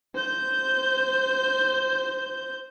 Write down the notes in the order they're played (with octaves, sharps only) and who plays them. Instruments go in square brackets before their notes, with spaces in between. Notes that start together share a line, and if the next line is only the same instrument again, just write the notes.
[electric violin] C5 G6